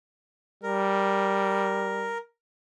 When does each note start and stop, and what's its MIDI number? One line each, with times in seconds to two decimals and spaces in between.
0.63 2.15 55
0.63 2.18 70